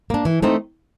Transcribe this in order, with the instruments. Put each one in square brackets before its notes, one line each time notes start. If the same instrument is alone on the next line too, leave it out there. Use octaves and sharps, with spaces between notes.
[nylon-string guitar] A#3 D4
E3
A3 C4 D#4